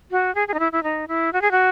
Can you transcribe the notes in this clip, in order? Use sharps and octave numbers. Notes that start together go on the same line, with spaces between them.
F#4
G#4
G#4
D#4
E4
E4
D#4
E4
F#4
G#4
F#4